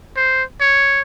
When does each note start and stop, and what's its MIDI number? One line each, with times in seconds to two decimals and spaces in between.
0.16 0.43 72
0.60 1.01 73